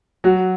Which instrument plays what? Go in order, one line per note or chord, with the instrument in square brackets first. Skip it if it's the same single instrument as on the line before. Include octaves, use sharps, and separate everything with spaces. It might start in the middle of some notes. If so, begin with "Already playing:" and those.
[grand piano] F#3 [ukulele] F#4